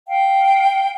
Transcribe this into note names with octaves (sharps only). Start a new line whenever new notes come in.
F5 G5